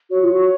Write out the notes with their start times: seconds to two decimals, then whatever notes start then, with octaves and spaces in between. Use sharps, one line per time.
0.10 F#4 C#5
0.22 F4
0.33 F#4